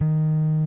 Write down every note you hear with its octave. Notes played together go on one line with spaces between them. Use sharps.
D#3